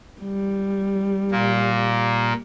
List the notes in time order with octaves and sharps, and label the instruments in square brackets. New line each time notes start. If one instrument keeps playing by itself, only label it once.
[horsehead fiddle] G3
[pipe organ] A#2 A#3